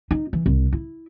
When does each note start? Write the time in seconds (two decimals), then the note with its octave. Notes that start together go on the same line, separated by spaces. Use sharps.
0.11 D#4
0.33 E3
0.46 C2
0.72 E4